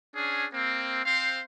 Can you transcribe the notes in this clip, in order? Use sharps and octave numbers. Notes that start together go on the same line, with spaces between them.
C#4 D4 G#4
A#3 C4
C4 C5 F5